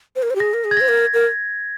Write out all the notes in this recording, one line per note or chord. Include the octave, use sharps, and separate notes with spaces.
C5
A#4
C5
G4
G#4 A#6
A#4
G#4
G#6
C5 A#6
A#4
A#4